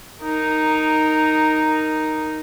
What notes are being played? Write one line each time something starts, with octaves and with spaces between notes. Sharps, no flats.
D#4 A#4